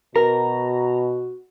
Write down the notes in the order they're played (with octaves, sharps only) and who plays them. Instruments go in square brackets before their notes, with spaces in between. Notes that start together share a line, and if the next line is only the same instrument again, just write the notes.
[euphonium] B2 [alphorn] F#4 [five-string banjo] A#4 [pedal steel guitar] A#5